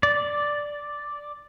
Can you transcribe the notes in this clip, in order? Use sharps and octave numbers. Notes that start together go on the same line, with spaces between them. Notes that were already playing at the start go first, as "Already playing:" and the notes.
D5